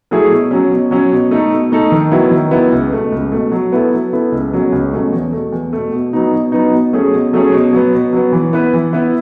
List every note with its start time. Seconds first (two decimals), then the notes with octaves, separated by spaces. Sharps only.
0.11 F#3 A3 E4 G#4
0.31 B2
0.51 F#3 C#4
0.71 B2
0.91 F#3 C#4
1.12 B2
1.31 A3 D#4 A4
1.52 B2
1.72 A3 D#4 A4
1.92 D#3
2.12 F#3 B3 E4
2.31 D#3
2.51 F#3 B3 E4
2.72 C#2
2.92 B2 A3
3.12 C#2
3.32 B2 A3
3.52 F#3
3.72 B3 E4 A4
3.92 F#3
4.13 B3 E4 A4
4.32 C#2
4.52 B2 F#3 A3 C#4
4.72 C#2
4.93 B2 F#3 A3 C#4
5.12 E2
5.33 B2 A3
5.52 E2
5.73 B2 A3
5.92 B2
6.13 F#3 B3 D#4
6.32 B2
6.52 F#3 B3 D#4
6.72 B2
6.93 F#3 A3 C#4 G#4
7.13 B2
7.33 F#3 A3 C#4 G#4
7.52 B2
7.73 F#3 B3
7.93 B2
8.13 F#3 B3
8.32 E3
8.53 B3 E4 B4
8.73 E3
8.93 B3 E4 B4